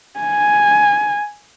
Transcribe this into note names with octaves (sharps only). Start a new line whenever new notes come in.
G#5